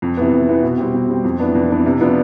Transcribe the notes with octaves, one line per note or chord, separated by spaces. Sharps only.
F2
C3 E3 B3
F2
C3 E3 B3
B2
G3 C4 G4
B2
G3 C4 G4
F2
E3 B3 D4
F2
E3 B3 D4
C3
F3 B3 D4